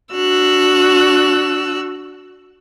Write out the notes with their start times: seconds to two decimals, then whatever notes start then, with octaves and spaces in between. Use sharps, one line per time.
0.13 D4 F#4 E6 F#6